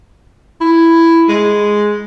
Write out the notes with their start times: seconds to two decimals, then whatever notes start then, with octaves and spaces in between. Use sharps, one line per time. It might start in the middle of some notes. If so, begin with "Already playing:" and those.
0.61 E4
1.29 G#3